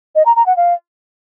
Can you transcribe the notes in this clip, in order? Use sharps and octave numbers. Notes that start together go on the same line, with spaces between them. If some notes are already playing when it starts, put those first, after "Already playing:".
D#5
A#5
A#5
F#5
F5